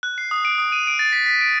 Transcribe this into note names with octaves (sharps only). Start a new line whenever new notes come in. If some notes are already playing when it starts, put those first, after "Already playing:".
F#6
C7
D#6
D7
D#6
D#7
D7
A6
B6
B6
D7